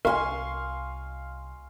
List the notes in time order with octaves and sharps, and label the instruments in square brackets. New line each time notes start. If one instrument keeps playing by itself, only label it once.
[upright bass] C2 [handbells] A#4 [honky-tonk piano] F5 [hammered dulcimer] G#5 C6 C#6